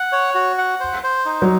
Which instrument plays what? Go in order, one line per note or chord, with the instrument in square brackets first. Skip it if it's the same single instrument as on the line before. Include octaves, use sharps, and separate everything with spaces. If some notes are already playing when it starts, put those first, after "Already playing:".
Already playing: [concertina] F#5
C#5
F#4
F#5
C5
C5
D#4
[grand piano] F#3